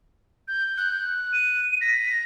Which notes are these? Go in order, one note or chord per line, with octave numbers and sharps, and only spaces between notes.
G6
F#6
D#7
A#6 B6